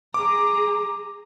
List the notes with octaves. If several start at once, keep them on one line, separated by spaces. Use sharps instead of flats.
G#4 A#5 D6